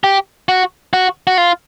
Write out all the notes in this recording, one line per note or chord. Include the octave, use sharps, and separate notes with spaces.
G4
F#4
F#4
F#4
F4